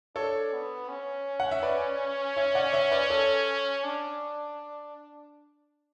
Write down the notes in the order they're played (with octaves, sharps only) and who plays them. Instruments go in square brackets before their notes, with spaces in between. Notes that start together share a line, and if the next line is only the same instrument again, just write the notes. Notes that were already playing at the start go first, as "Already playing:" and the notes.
[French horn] D4 [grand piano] A4 C#5
[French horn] B3
C#4
[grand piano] F#5
E5
B4 D5
C#5 E5
D5 F#5
C#5 E5
B4 D5
A4 C#5
[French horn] D4